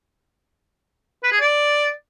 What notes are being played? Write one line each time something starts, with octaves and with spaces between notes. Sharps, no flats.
B4
G#4
D5